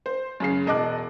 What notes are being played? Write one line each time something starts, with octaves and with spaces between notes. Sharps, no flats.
C5
F#2 C#3 C7
E1 D#5 A5 D6 F#6